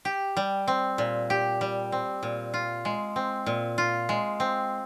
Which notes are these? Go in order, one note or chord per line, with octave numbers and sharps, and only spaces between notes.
G4
G3
C4
A#2
G4
G3
C4
A#2
F4
G#3
C4
A#2
F4
G#3
C4